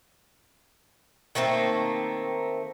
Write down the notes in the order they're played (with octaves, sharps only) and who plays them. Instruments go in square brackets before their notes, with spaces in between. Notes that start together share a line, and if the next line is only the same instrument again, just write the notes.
[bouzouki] D#3 A3 A#3 C4